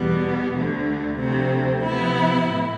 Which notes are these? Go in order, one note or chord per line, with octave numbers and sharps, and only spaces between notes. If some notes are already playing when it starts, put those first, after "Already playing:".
Already playing: E2 B2 G3 B3
D2 D3 A3
D2 C3 F3 A3 C4
C3 F3 B3 E4
A2